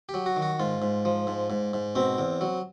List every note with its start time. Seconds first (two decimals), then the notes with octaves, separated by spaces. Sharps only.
0.09 G4
0.14 F#3
0.26 F#4
0.36 D#3
0.42 F#4
0.60 G#2 F4
0.82 G#2
1.05 F3
1.27 G#2
1.50 G#2
1.73 G#2
1.95 B2 C4
2.18 E2
2.41 F#3